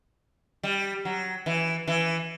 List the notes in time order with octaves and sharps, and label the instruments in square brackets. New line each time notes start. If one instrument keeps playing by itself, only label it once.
[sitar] G3
F#3
E3
E3